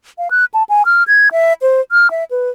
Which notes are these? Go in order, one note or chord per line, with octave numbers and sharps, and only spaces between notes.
F5
F#6
A5
G#5
F6
G#6
E5
C5
F6
E5
B4